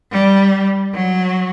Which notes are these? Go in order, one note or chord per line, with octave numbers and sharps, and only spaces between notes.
G3
F#3